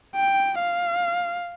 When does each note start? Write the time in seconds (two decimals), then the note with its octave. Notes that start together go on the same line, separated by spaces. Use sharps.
0.16 G5
0.59 F5